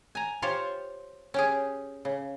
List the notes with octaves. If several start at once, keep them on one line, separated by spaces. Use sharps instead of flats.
G#5 A#5
F4 G4 C5 C#5
C#4 G4 G#4
C#3